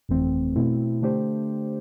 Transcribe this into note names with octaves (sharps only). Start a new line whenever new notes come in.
G1 F2 E3 A3 C4
B2 A3 C4 E4
D3 A3 D4 G4 C5